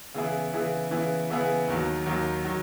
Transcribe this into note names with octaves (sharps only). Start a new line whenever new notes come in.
C#3 E3 B3 E4 G#4
C#3 E3 B3 E4 G#4
C#3 E3 B3 E4 G#4
C#3 E3 B3 E4 G#4
D#2 D#3 F#3
D#2 D#3 F#3
D#3 F#3